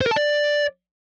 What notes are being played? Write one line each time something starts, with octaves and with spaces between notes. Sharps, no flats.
C5
A#4
A5
D5